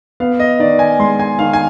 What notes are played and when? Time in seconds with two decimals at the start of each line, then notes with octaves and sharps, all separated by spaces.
0.20 B3 F5
0.40 D#5
0.59 D#3 D5
0.79 G#5
0.99 G#3 C6
1.19 G#5
1.39 D#3 F5
1.53 G#5